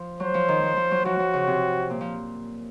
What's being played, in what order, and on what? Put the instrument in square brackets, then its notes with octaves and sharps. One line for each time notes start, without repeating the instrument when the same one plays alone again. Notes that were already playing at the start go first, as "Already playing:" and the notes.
Already playing: [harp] F3
[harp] F#3 [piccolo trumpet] C5
[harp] F3
D#3
F3
F3
F#3
[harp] F3 [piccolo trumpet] F#4
[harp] F3
C#3
C3
A#2
F3